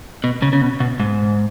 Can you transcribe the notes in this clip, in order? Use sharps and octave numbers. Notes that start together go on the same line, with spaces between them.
B2
C#3
C#3
B2
B2
G#2